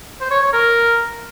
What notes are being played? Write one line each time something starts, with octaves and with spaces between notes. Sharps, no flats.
C5
C#5
C#5
A#4